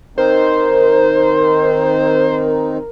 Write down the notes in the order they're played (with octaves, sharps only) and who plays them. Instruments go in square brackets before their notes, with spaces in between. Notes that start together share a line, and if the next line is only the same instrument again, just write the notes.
[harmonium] D#3 C4 D#4 [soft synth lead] A#4 [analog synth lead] C5